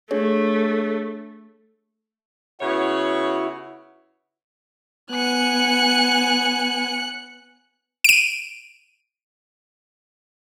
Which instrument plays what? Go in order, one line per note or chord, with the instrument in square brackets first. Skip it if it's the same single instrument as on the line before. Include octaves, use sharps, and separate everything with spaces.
[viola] A3 [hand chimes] D4 G#4 C#5
[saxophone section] C#3 B3 C#5 [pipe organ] E4 F#4
[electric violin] B3 G#5 [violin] F#6 C#7
[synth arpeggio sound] D7 D#7